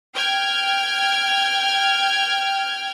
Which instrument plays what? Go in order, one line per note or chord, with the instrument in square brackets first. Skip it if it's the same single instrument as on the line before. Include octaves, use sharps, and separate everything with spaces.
[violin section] G5 F6 G#6